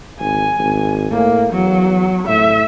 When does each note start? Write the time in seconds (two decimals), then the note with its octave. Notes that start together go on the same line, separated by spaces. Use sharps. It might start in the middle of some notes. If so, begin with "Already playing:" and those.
0.20 G#1 G#5
0.59 G#1
1.11 A2 A#3
1.53 E2 F#3
2.28 A2 E5